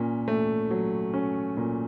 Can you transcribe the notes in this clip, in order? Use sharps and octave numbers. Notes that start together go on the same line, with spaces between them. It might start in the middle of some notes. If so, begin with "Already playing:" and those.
Already playing: A#2 C#4
A3
F#3
C#4
A#2